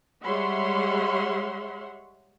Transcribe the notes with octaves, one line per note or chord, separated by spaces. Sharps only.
G3 G#3 C#5 E5 F#5 C6